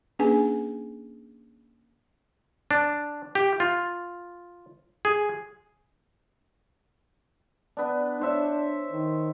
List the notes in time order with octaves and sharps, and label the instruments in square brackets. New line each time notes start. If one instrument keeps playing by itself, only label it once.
[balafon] A#3 C#4 D4 G#4 B4 G#5
[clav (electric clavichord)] D4
G4
F4
G#4
[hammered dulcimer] B3 D4
[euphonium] D4 [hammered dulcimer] C5 C#5 E5
[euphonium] D#3